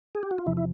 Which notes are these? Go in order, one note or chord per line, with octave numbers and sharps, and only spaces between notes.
G#4
G4
F#4
F4
E2 C3 F3 E4
E4